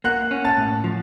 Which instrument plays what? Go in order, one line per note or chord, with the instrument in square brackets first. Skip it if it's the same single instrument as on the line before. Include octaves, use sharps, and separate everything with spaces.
[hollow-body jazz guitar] A#3 [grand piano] F#5 F#6
[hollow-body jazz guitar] C#4
[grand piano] A5 A6
[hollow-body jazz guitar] A2
F3